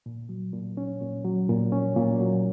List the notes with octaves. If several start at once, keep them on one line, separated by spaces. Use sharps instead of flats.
A#2
F#3
A#2
C#4
A#2
F#3
A#2
C#4
A#2
F#3